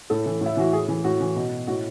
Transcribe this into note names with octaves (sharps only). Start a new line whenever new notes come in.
A2 A4
E3
A2 E4
E3 F#4
A2 G#4
E3
A2 F#4
E3
B2
A2 F#4